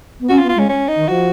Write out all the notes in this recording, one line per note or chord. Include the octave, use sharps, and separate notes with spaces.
B3
C#4 F#4
F4
B3
F4
G#3 C#4
C#4
D#4
D#3
F3 F#4